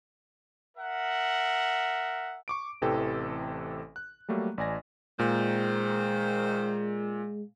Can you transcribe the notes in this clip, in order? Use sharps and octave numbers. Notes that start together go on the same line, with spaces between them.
A#4 E5 F#5
C#6 D6 D7
A1 C3 E3 C4 A4 G5
F#6
F#3 G3 A3 A#3
A1 D5 G#5 A#6
A#2 D#3 G#3 C5